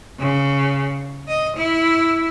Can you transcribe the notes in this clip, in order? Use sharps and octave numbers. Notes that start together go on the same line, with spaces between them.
C#3
D#5
E4